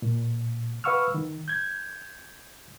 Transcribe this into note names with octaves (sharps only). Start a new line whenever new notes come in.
A#2
B4 F5 F#5 C#6 E6 F6
D#3
G6 G#6